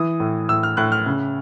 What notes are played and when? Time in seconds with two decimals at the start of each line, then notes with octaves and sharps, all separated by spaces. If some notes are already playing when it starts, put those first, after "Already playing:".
Already playing: E3 D#6
0.20 A2
0.49 A2 E6
0.63 F6
0.77 A2 F#6
0.92 F6
1.06 C#3